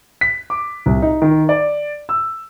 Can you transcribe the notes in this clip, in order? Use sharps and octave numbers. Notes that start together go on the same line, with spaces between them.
B6
D6
C2
D#4
D#3
D5
E6